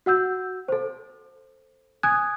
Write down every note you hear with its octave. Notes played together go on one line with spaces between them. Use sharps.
F#4 F#5 E6 G6
A4 C5
G#5 D#6 F#6 G#6